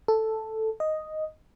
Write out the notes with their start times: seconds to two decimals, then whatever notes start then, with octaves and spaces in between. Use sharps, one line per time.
0.08 A4
0.80 D#5